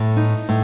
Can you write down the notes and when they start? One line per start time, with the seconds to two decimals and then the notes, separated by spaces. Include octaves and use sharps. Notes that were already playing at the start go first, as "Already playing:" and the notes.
Already playing: A2
0.17 D#4
0.49 A2